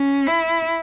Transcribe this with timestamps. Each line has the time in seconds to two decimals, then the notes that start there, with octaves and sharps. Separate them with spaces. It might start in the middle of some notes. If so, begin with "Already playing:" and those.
Already playing: C#4
0.27 E4